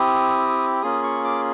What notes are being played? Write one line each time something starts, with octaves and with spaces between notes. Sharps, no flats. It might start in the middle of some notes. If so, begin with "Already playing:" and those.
Already playing: C4 E4 G4 D#6
A#3 C#4 F4 G#4 D#6
C#6
D6